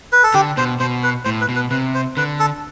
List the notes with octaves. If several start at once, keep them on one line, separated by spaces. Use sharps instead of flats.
B4
A4
D3 G4
B2 C5
B2 C5
B4
A2 C5
B4
B2
B4
C3 B4
C5
D3 B4
A4